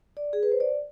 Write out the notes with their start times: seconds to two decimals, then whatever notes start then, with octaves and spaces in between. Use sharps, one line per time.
0.17 D5
0.33 G#4
0.43 B4
0.52 C5
0.60 D5